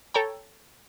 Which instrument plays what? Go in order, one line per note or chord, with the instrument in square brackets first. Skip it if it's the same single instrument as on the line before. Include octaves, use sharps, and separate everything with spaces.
[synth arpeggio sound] A4 C#5 G5 A#5